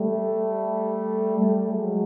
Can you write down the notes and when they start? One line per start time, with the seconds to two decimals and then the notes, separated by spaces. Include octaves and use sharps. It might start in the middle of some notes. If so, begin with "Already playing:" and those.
Already playing: G3 A3
1.38 G3 A3
1.68 F#3 G#3